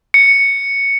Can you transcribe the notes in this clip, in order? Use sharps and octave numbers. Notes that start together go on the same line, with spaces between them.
C#7